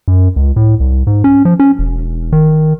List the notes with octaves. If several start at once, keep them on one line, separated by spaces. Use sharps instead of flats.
F#2
C#2
A2
C2
G#2
C#4
F3
C#4
E1
D#3